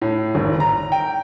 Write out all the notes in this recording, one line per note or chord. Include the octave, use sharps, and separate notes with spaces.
A2
G#1
A#5
G5